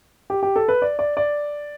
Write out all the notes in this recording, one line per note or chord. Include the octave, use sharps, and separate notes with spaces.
G4
G4
A4
B4
D5
D5
D5